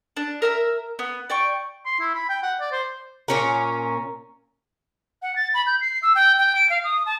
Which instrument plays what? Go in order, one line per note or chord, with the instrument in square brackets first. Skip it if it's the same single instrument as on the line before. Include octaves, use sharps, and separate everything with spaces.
[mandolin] D4
A#4 E5 A#5
B3
D5 G5 C#6
[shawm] C6
E4
B5
G5
F#5
D5
C5
[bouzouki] A#2 C#4 A#4
[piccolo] F#5
A6
B5
G6
C7
E6
G5
G5
D7
F5
D#6
A5